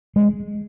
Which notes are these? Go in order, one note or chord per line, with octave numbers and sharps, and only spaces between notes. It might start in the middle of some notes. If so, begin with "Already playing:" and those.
G#3